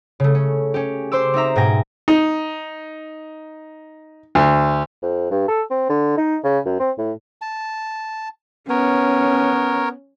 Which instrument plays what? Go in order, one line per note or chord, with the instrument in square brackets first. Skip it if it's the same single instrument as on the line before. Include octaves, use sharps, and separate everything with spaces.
[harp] C#3 A3
C#4
C#4 G4
C5 C6 D6 E6
C4 D#4 E5 A#5
G#2 B2 G5 G#5 A#6
[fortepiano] D#4
D2
[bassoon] F2
G2
A4
C4
D3
D#4
C#3
F#2
C4
A2
[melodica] A5
[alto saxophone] B3 [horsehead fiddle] C#4 [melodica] A#4 C#5